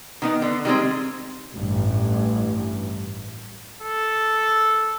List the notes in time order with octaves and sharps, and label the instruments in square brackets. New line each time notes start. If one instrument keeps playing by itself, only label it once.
[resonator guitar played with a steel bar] D#3 B3 D#4
D3
D#3 G3 G#3 C4
[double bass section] A1 G2
[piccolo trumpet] A4